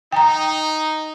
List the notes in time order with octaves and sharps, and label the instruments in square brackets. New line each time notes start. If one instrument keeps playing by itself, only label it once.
[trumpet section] D#4 [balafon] G5 A#5